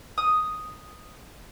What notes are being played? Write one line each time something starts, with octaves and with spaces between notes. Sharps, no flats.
D#6